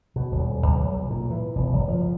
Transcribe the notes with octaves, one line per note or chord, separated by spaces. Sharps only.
B2
D#1
B1
A#2
E3
E1
F#1
F3